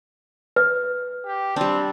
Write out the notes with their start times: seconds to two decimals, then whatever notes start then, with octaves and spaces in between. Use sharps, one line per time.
0.56 B4
1.25 G4
1.56 G3 C4 D4